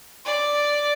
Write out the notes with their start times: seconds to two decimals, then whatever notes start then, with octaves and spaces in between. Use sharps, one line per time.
0.25 D5